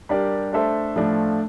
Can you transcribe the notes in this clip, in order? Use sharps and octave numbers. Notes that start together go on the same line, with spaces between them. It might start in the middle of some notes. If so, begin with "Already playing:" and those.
G3 D4 G4 A#4 D5
A3 D4 A4 C5 E5
A2 F3 A3 D4 F4